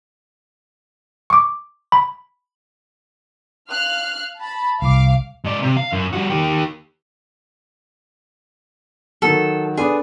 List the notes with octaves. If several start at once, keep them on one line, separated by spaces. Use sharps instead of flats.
C#6 D6
B5
F5 F6 F#6
A5 B5
C2 F5 D6
G#2 D5
C3
F5
F#2
G3 F#4
D#3 G4
D#3 F#3 A4
B3 D4 G#4 A4